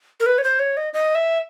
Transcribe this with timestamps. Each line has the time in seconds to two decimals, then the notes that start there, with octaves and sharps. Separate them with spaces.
0.20 A#4
0.26 B4
0.38 C#5
0.44 C5
0.59 C#5
0.77 D#5
0.93 D#5
1.15 E5